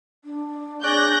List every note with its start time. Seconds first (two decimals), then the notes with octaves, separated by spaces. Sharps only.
0.25 D4
0.84 G#4 C#5 D5 F#6 G6 A#6